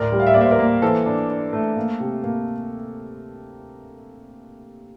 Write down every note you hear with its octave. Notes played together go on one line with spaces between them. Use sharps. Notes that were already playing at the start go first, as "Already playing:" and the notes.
Already playing: D2 A2 A#4 D5
G3
F5
E5
A#3 D5
C5 E5
A#4 D5
A#3
E3 A4 C5
D4
D4
A3
A#3
C3
A#3